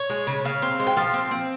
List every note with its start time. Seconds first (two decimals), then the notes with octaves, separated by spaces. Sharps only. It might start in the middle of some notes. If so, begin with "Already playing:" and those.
Already playing: C#5
0.10 G#3
0.27 C#3
0.45 C#3 F5
0.62 C4
0.80 G#3
0.87 G5
0.97 F3 F5
1.14 C4
1.31 C4